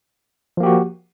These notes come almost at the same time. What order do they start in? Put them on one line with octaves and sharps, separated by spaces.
F3 A#3 G4 F#4